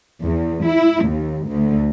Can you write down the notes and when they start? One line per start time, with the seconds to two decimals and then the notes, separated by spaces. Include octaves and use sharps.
0.25 E2
0.67 E4
1.07 D#2
1.50 D2